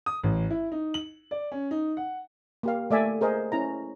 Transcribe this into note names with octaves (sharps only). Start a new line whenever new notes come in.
D#6
A1
E4
D#4
F#7
D5
C#4
D#4
F#5
A#3 G4 F5
A3 D5 E5 G#5
G#4 A#4 C5 D#5
C#4 E4 A#5